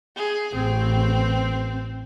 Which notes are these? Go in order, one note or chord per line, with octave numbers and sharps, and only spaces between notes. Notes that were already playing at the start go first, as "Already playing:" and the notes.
G#4
A1 C4